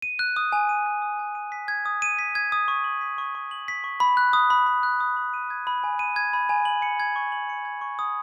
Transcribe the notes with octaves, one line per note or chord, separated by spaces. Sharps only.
D#7
F#6
D#6
G#5
D#7
F#6
D#6
G#5
D#7
B6
G#6
D#6
D#7
B6
G#6
D#6
C#6
F#7
B6
C#6
C#6
F#7
B6
C#6
B5
F#6
D#6
B5
B5
F#6
D#6
B5
D#7
G#6
B5
G#5
D#7
G#6
B5
G#5
F#7
C#7
G#6
C#6
F#7
C#7
G#6
C#6
D#6